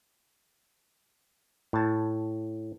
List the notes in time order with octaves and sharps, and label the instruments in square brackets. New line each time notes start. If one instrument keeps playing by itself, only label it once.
[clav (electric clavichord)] A2 A5